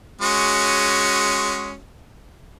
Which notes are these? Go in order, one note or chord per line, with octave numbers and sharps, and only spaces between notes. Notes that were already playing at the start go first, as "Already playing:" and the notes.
G#3 C#4 F#4